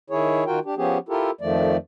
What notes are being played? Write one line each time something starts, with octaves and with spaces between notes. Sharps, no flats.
D#3 E4 G#4 C#5
D#3 F4 F#4 A#4 G5
D4 G4
F3 B3 C#4 G4 G#4
E4 F4 G4 A4 A#4
F2 D#3 F3 A3 D5